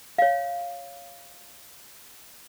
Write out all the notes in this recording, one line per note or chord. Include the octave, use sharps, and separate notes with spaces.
C#5 F5